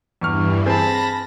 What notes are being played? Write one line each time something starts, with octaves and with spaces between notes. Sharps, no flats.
E2 G2 E3 C#6 F6
C4 G#4 A5 B5 A#6